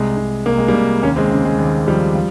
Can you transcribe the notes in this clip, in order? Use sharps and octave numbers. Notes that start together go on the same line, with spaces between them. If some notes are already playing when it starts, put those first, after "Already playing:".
Already playing: C2 G#3
C2
C2 A#3
G#3
G3 A#3
C2
D#2 A#3 C#4
G#3 C4
C#3
G#3
D#2
F3 G3
F3